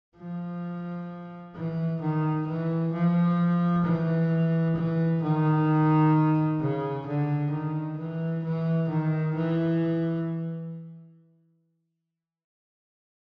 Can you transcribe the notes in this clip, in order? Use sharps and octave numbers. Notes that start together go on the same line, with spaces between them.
F3
E3
D#3
E3
F3
E3
E3
D#3
C#3
D3
D#3
E3
E3
D#3
E3